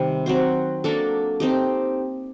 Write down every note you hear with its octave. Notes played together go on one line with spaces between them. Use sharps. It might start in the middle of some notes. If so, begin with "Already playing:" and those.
Already playing: C3 D#3 G3
F#3 C4 F#4 C5
F#3 A#3 D4 A4
C4 D#4 G4